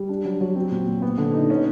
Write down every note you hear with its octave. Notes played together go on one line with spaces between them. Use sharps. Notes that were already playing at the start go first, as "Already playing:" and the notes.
Already playing: G3
D4
F#3
F#3
C4
A#2
A#2
B3
D3
D#4
C#4